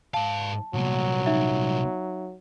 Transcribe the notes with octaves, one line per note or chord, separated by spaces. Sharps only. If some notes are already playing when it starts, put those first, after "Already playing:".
G#2 F5 A5
C2 A#2 F#3
D#4 E5